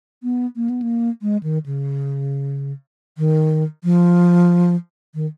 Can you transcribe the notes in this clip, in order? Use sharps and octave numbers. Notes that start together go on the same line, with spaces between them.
B3
A#3
B3
A#3
G#3
D#3
C#3
D#3
F3
D#3